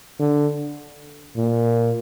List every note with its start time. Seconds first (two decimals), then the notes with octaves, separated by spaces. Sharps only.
0.20 D3
1.37 A#2